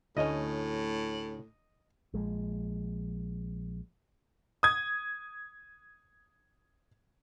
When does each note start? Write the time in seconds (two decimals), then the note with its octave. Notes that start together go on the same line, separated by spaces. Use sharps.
0.17 D2 A2 C#4 D#5
2.14 A#1 F3 G#3
4.63 D#6 G#6